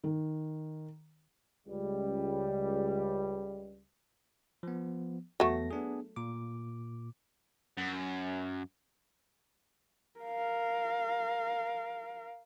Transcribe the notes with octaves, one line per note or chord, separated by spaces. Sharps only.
D#3
C#2 G3
F3 B3
E2 F#3 A3 B3 A#6
B3 D4 G#4
A#2 D6
F#2
A#4 F5